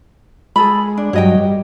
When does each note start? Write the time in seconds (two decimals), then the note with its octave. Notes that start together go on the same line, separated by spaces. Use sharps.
0.56 G#3 G#4 A4 B5
0.97 D4
1.13 G2 F#3 C#5 D#5 G5
1.38 G3